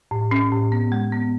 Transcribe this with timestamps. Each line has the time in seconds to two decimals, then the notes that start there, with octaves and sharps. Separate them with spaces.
0.11 A2
0.31 C#4
0.52 A2
0.72 B3
0.92 G#3
1.12 B3